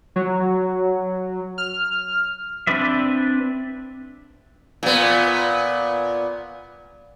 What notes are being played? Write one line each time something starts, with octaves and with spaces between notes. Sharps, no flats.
F#3
F6
C4 D4 B4 D5 E5
A#2 B3